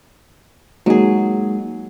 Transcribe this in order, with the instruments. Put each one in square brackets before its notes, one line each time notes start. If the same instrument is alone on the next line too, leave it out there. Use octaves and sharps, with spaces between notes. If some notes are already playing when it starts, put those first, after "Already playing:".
[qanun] F#3 G#4 [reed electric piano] G#3 A#3 D#4